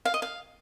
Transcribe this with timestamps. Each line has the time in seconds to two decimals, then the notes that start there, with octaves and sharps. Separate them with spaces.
0.05 F5
0.14 D#5
0.22 F5